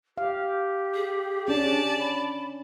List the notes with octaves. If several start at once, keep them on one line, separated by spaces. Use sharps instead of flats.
G4 F5
G#4
C#4 D4 D5 A5
B5